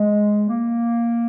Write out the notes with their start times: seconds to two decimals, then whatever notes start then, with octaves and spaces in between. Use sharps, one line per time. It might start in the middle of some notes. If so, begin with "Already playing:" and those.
Already playing: G#3
0.49 A#3